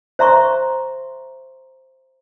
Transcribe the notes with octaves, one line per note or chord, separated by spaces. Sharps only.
C5 E5 A#5 C6 C#6